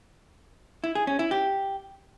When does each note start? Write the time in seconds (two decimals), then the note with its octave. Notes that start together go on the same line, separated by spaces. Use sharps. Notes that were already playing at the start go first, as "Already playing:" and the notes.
0.84 E4
0.95 G#4
1.07 C#4
1.19 E4
1.31 G4